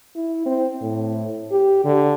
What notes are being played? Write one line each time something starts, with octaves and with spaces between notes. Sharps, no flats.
E4
C4
A2
G4
D3